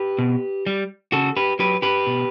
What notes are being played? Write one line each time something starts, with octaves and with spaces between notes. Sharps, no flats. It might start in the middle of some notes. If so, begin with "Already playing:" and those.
Already playing: G4 B4
B2
G3
C#3 F#4 A4
G4 B4
F#3 G4 B4
G4 B4
B2